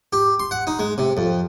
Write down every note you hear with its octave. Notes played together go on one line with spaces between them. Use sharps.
G4
C6
F#5
D#4
G#3
C3
F2